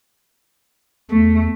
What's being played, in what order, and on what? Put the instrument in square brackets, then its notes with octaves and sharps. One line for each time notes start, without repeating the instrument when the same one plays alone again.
[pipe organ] E2 [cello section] A3